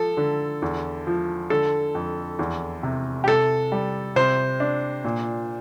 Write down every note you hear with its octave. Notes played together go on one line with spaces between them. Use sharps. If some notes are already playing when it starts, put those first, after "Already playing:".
Already playing: F3 A4
D3
E2
F3
D3 A4
F2
E2
C3
G4
C3 A4
G3
C3 C5
D4
A#2